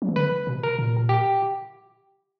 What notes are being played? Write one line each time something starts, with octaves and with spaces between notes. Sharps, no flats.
F#3
E3
D3 B4
B2
A#4
A#2
G4